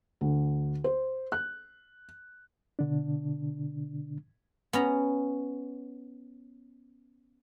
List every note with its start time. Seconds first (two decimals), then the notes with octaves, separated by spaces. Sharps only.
0.21 D2
0.84 C5
1.32 F#6
2.79 B2 D3 D4
4.73 B3 C#4 A#5